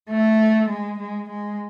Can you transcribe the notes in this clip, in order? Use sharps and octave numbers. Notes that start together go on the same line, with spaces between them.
A3
G#3
G#3
G#3